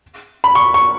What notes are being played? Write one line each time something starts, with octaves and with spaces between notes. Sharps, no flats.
B5
C#6
C#6